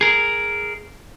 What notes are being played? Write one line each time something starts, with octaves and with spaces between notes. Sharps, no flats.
G#4 A#4